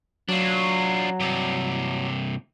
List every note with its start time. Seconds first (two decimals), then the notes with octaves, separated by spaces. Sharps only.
0.29 F#3 D4 F4
1.20 G2 C3